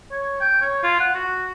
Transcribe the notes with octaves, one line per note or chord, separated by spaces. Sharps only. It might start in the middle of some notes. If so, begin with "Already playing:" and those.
C#5
G5
C#5
F4
F#5
F#4